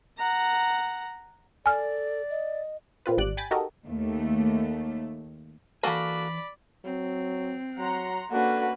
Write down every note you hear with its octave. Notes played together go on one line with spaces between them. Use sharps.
F#5 A#5
A4 D5 G#5 F6
D#5
A#2 C4 F4 B4
G#1 G3 D5 F#6 D7
G5 G#5 B5 A6
D#4 F#4 G4 A4 A#4 D#5
D#2 A3
E3 A#3 F#4 A4 D5 F5 G#5 B5
F#3 C4
F#3 F#5 A#5 C6
A#3 C#4 D4 F#4 A4 B4